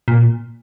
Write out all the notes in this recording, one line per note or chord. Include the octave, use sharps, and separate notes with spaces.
A#2